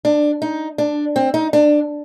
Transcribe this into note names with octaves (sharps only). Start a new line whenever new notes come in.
D4
D#4
D4
C4
D#4
D4